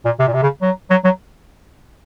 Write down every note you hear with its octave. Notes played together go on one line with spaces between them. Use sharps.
A#2
C3
A#2
C3
C#3
F#3
F#3
F#3